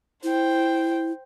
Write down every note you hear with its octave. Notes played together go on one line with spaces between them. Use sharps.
E4 C5 G5